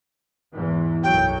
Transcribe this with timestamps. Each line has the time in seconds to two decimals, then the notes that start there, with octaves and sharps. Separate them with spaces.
0.53 E2 G#2 E3
1.04 B1 F#2 F#3 G5